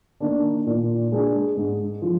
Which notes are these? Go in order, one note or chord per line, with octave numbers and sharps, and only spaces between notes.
D#3 A#3 D4
A#2
G#3 D4 G#4
G#2
F3